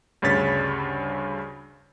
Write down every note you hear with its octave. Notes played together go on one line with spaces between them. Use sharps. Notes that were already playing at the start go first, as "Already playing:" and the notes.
D2 G2 C#3 C#5 A6 B6